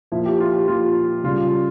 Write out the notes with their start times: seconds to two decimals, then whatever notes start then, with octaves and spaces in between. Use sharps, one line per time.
0.12 A#2 F3 E4
0.26 G4
0.40 F4
0.53 G4
0.68 A#2 F3 F4
1.24 C#3 G3 F4